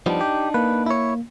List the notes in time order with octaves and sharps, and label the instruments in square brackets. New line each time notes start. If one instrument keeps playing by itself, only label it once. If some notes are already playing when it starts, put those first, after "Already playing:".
[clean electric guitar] F3 G3 B3 [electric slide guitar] D4 D#4
[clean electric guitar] G4
[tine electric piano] A#3 [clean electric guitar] B4
[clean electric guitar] E4 C#5